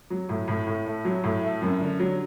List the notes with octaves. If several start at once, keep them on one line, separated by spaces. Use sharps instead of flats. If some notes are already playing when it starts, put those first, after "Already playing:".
F#3
A2
A2
A2
A3
F#3
A2
A3
F#2
D3
F#3